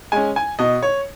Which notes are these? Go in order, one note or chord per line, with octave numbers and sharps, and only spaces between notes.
G#3 C#4 G#5
G#5
B2 D#5
C#5